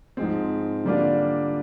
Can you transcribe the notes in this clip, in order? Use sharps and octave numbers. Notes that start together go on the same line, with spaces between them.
G#2 F3 G#3 C4
D3 G3 A#3 D4 F4